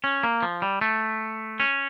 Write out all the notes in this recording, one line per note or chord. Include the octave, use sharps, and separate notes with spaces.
C#4
A#3
F3
G3
A3
C#4